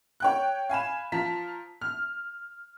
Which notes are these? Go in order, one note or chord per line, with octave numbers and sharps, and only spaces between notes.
C#5 G5 F#6
F5 G#5 B5 E7
F3 F4 A5 A#5 B6
F6